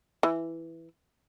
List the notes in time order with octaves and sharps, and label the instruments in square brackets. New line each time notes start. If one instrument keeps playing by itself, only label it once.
[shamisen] E3